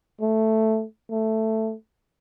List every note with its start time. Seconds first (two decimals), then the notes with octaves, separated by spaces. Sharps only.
0.21 A3
1.11 A3